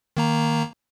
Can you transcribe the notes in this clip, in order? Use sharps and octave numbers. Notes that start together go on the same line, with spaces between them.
D#3 A#3 A#5